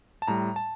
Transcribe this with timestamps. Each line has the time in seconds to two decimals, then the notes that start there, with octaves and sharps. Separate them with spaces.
0.22 A5
0.28 A2 G3 A#5
0.56 A5